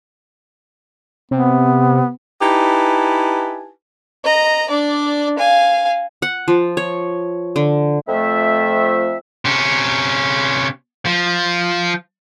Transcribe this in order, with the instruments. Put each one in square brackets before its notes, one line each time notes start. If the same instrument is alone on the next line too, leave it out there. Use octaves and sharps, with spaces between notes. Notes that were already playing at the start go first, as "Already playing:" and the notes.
[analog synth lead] C3 [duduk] B3
[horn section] D#4 E4 G4 B4 G#5 A5
[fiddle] D#5 A#5
D4 D5
F5 G#5
[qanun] F#5
F3
C#5
D3
[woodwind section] F2 A3 E5
[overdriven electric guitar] C3 C#4
F3